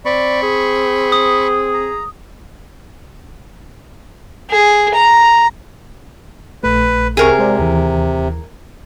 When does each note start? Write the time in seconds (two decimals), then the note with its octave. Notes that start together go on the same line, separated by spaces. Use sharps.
0.06 C4 D5 B5 C#6
0.42 G#4
1.12 D#6
1.74 A#5
4.50 G#4
4.94 A#5
6.63 A#1 A3 B4
7.17 C2 C3 G#4 A#4 C#6
7.39 G#3 C5 D5
7.59 D#2 E3